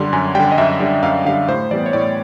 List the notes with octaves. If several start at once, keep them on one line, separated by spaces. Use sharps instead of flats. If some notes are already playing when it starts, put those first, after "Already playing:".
Already playing: F#2 D3 G3 C6
F#2 G#5
D3 G3 G5
D#5
F#2 E5
D3 G3
F#2 F5
D3 G3 F5
A2 C5
E3 G3 B3 D5
C#5
A2 D5